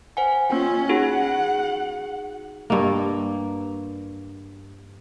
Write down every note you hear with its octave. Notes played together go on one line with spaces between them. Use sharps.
C5 F#5 G#5
A#3 C#4 F4 G5
D#4 F#4 G#4 F#5
G2 A#3